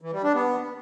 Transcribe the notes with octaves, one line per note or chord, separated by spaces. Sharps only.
E3
G3
D4
B3